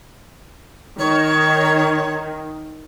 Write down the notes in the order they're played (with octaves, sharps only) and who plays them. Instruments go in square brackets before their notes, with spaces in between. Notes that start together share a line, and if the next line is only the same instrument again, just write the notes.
[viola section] D#3 [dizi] C#5